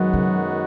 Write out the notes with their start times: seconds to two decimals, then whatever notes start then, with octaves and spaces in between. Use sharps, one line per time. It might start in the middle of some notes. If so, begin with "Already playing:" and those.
Already playing: F#2 D#3 F#3 G#3 B3 F#4
0.13 C#3